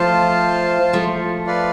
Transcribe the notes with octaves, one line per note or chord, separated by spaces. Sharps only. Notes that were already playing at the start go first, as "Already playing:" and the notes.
Already playing: F3 A3 F4 C5 F5 A5
F3 A3
F4 B4 D5 F5